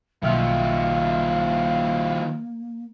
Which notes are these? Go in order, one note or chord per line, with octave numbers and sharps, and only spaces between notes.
B1 D#3 F3 A#3 E5 F5 F6